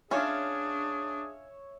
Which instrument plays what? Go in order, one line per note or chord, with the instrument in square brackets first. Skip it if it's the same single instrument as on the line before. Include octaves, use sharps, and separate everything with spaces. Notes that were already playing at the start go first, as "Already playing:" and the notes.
[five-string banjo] C#4 F4 [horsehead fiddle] D4 [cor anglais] G#4 [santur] C#5 E5